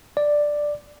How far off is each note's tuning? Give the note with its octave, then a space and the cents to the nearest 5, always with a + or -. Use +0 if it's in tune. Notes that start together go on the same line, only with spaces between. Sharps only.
D5 +5